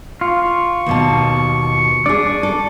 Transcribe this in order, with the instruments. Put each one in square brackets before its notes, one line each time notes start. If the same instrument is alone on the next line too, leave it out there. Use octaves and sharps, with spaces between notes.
[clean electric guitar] F4 [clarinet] C#6
[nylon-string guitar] D#2 B2 A5
[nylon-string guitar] D4 G#4 [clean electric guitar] D5
[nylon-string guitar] A4